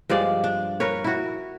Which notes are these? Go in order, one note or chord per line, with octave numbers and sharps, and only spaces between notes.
G2 F3 G#3 D5
D4
A#4 B4 C#5
E4 F#4